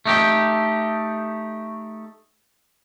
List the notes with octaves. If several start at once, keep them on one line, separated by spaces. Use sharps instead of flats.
A3 D#4 G4